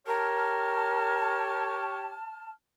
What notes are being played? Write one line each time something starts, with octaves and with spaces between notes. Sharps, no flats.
G4 A#4 C#5 A5 F6